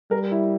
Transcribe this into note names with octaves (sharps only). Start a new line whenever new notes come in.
G3 A#4
E4